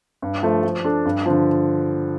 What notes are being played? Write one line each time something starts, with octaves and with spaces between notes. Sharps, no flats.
G2
F3 A3
F3
D4 A4
G2
D3 F3